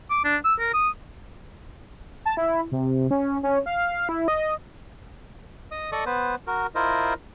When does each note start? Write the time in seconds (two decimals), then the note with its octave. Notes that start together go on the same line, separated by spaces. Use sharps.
0.11 D6
0.24 D4
0.44 E6
0.60 A#4
0.74 D#6
2.25 A5
2.37 E4
2.72 C3
3.11 C#4
3.43 C#4
3.66 F5
4.09 E4
4.28 D#5
5.72 D#5 D#6
5.92 A4 D5 D#5 C#6 D#6
6.06 B3 B4 C5
6.47 F#4 A#4
6.75 E4 F4 A#4 C5 D#5